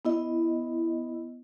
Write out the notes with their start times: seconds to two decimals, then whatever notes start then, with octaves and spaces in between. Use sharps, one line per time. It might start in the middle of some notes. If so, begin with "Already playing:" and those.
0.05 B3 E4 D#5